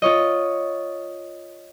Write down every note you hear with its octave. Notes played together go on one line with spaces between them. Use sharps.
F4 C#5 D#5